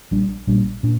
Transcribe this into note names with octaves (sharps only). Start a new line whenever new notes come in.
A#1 A#2 G3 D4
A#1 A#2 G3 D4
A#2 D4